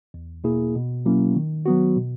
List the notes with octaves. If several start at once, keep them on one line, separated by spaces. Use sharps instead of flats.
E2
B2 A#3 E4 G#4
B2
F#3 A#3 C#4 E4
D#3
F#3 B3 F#4
B2